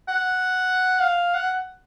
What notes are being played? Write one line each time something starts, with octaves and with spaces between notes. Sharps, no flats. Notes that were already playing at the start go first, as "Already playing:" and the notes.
F#5
F5
F#5